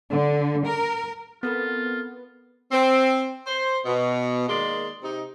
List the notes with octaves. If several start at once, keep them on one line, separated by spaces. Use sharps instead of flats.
D3
A#4
B3 C4 F4 A4 A#4
C4
C5 C6
B2
D#3 G#3 A#3 D5 C6
C3 D#4